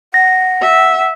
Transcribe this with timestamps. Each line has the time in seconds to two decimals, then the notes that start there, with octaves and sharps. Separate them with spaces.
0.14 F#5 A#6
0.61 E5